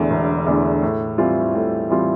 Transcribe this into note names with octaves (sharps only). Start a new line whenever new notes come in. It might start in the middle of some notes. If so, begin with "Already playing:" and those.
Already playing: E1 E2 D3 A3
E1
E2 D3 A3
A2
E3 G3 C4 F4
A2
E3 G3 C4 F4